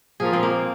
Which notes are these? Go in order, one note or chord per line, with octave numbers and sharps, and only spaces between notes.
A#2 F3 A#3 F4 G#4
C4
A#3